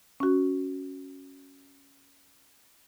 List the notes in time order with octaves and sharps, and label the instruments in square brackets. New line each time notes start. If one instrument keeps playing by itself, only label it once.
[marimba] C#4 F#4